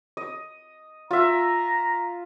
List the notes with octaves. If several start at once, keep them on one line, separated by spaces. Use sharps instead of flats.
D#5
F4 E5 A#5